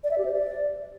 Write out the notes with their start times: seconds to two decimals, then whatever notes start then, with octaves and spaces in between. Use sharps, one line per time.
0.04 D5
0.11 E5
0.18 G4
0.25 C5
0.33 D5